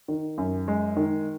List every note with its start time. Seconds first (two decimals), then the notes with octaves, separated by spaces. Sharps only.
0.08 D#3
0.38 F#2
0.68 G#3
0.97 D#3